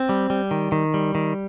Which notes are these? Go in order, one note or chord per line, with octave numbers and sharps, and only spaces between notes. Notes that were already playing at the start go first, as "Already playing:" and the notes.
Already playing: C4
G3
G3
D#3
D#3
G3
D#3